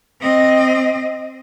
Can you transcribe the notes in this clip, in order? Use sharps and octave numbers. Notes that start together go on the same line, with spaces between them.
C4 D#5